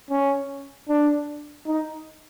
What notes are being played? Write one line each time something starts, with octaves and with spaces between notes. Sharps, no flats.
C#4
D4
D#4